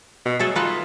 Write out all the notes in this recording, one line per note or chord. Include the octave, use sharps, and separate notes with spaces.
B2
F#3 A3 G#4 A4
D#4 F4 B4 A5